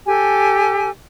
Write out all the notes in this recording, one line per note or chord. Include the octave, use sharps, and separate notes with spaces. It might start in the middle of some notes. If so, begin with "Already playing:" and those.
G4 A4 G#5